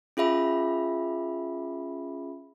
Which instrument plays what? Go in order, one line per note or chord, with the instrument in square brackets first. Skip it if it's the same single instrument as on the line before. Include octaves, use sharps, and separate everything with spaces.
[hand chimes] C#4 F4 G#4 E5 B5